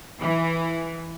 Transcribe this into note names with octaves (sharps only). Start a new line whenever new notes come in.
E3